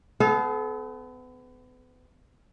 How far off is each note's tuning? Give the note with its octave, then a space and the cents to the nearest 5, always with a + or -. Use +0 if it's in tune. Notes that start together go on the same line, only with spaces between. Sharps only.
B3 +35 A4 -35 F5 +0